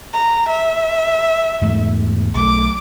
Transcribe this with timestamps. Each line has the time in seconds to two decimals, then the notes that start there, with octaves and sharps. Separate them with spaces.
0.14 A#5
0.49 E5
1.61 E2 G#2 A3
2.35 B1 A3 D6